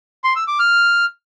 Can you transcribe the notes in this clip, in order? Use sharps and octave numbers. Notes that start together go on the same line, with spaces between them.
C6
E6
D6
F6